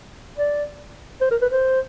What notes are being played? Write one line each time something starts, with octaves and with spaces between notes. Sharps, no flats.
D5
C5
A#4
B4
C5